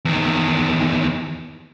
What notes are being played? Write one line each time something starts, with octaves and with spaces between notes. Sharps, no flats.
E2 D#3